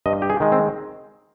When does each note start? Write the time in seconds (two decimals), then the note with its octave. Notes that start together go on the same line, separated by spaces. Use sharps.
0.06 G2 D#5
0.22 G4
0.30 G#4
0.40 D#3 G#3
0.52 C4